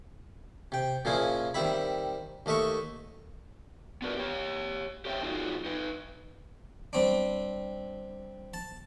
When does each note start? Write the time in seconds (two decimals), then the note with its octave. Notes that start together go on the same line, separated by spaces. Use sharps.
0.72 C3 G5
1.05 A#2 C#3 F3 E4 F4 G#4
1.54 D#3 G3 C4 E5 B5
2.46 D#2 A3 D#5 E5 C#6
4.02 B3 D4 F#4 A#4 B4
4.17 G4 C#5
5.05 G4 C#5 D#5 E5 G5
5.23 F#3 D#4 F4 F#4 G#4
5.64 D#4 B4
6.93 G3 C4 D4
8.54 A5